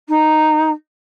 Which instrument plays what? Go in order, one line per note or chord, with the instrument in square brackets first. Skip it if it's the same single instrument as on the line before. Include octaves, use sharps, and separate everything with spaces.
[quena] D#4